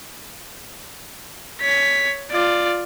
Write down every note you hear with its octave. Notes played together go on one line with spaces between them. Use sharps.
C#5 B6
F4 D5